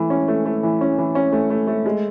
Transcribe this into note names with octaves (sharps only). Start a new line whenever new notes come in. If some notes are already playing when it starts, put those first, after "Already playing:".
Already playing: E3 A3
C#4
A3
A3
E3
C#4
E3
C#4
A3
A3
A3
G#3